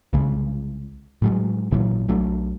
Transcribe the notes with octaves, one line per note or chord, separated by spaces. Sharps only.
C2 C#3 G#3
A2 F#3 G#3
G#1 A#2 E3 F#3
B1 F#3 A3 D4